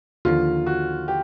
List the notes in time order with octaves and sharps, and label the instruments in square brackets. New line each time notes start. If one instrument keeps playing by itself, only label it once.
[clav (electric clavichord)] D#2 D3 F3 [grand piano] F4
[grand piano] F#4
G4